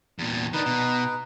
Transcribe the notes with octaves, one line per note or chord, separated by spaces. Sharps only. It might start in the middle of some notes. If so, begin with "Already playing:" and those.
E2 A#2
D#3 D4 D#4 B4
B2